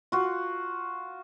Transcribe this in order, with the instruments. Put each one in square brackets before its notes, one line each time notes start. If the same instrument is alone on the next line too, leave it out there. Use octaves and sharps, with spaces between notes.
[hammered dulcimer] F4 F#4